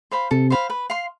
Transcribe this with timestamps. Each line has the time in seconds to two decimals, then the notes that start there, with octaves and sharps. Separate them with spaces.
0.11 C5 F5 B5
0.31 C3 A4
0.50 C5 F5 B5
0.70 B4
0.90 F5 C6